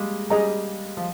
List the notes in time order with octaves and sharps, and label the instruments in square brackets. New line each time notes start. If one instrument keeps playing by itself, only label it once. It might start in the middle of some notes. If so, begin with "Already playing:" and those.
Already playing: [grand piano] G3 G#3 A#3
[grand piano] G3 [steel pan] G#4 D#5 A#5
[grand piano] F3